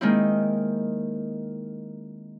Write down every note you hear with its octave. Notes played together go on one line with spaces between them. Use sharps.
D#3 G#3 A#3 C4 E4